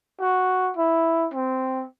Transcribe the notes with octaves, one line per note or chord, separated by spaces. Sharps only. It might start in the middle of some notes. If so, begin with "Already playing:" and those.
F#4
E4
C4